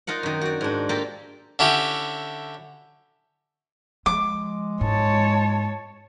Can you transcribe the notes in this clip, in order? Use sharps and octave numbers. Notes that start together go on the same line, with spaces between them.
D#4 F4 A#4 F#5
F#2 D#3
F#4 D5
G#2 D4
A#3 F4 G4 A4 A#4
D3 C#4 E4 G4
F3 G#3 D6
G#2 C#5 A5